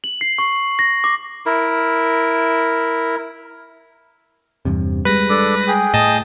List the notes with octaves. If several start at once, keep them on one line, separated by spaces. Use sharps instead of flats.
F#7
C7
C#6
A#6
D6
E4 A#4
E2 G2 C3
G3 G#3 B4 A#6
D4 A4 D6
G#4 G5
A2 D#5 A5